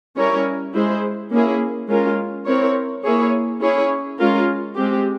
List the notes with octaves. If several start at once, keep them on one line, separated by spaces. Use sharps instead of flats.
G3 C#4 E4 A#4 C#5
G#3 E4 G#4 C5
A#3 C#4 E4 G#4
G#3 C#4 F4 A#4
C4 E4 A#4 C#5
A#3 E4 G#4 C#5
C#4 E4 G#4 C#5
G#3 C#4 F4 A#4
G#3 C4 G4